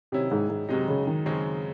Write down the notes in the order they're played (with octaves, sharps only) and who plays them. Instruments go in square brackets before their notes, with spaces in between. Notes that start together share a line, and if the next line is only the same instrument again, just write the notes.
[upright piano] C3 [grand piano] D#3 F#3 C#4 E4
[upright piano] G#2
G#2
[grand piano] F#2 D#3 G#3 D#4 [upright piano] C3
[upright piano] C#3
D#3
[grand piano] F#2 C#3 G#3 C4